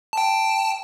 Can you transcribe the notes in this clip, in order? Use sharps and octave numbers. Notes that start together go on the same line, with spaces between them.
G5 A5